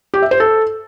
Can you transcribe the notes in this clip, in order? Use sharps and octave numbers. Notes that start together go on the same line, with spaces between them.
G4
E5
C5
A4